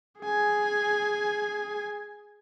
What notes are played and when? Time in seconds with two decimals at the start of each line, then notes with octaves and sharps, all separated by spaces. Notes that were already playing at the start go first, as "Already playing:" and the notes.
0.21 G#4 G#5